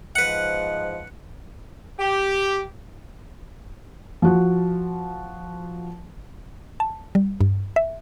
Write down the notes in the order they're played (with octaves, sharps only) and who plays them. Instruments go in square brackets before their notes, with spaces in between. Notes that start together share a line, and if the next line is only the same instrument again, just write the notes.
[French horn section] G#2 F3 D#5 [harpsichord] B4 F#5
[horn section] G4
[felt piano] F3 F#4
[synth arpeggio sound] A5
G3
G2
E5